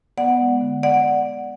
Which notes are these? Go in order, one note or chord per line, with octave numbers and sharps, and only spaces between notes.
B3 D5 F#5
G#3
D3
D5 F#5